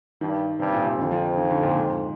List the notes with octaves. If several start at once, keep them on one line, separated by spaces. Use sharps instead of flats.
G2 D#3
G2 C3
A#2
C3
F2 D3
F3
F3
D#3
D3
A#2
G#2